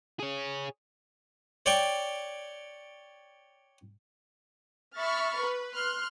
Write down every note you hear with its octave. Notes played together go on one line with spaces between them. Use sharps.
G#4 C#5
C#5 D5 G5 C#6
E5 B5 C#6 F6 A6
B4
C6 F6 F#6